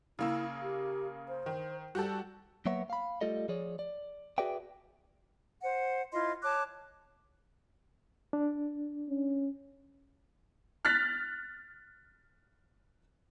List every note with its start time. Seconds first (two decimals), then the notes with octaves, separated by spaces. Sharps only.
0.19 C#3 A#3 E4 E6
0.62 G4
1.29 C5
1.46 D#3
1.95 G3 F#4 G4 A4
2.66 F#3 A#3 B3 C#5 E5 F#5
2.90 F5 B5
3.21 G3 A3 F4 A4 D#5
3.49 F3 G#4 C#5 D5
3.79 D5
4.38 F#4 G#4 B4 D5 E5 G5
5.63 C5 F#5
6.12 E4 F4 D#5 C6
6.43 C#5 A5 D6 F#6
8.33 D4
9.09 C#4
10.85 F6 F#6 A6 B6